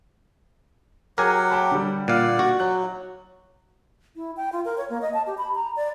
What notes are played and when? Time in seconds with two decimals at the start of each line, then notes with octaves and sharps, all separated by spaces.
1.18 F#3 G4 G#4 A#4 F#5 G#5
1.51 G5 A5 B5
1.72 D3 G3
2.08 A#2 D5 F5 F#5
2.39 F#4
2.60 F#3 F#6
4.16 E4
4.37 G5
4.52 F4
4.65 A#4
4.78 C#5
4.90 A#3
5.02 D#5
5.14 A5
5.27 G4
5.38 B5
5.55 A#5
5.76 D5